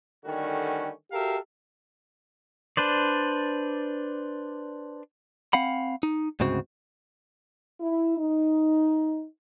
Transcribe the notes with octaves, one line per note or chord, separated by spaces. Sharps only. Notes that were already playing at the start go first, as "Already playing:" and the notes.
D3 D#3 G3 A3 C#4 F#4
F#4 G4 A4 A#4 E5 F5
D4 B4 C5 D5
C4 F5 F#5 B5
D#4
D2 G#2 C#3 C4 F#4
E4
D#4